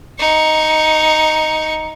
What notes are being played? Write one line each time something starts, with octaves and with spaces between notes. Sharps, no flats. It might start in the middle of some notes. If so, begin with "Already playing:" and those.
D#4 C#6